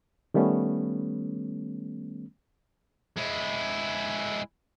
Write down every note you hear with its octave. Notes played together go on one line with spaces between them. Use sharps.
D#3 G3 A3 B3 C#4
G#3 E4